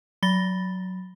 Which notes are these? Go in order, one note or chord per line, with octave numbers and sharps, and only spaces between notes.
F#3 B5 A6 A#6 G7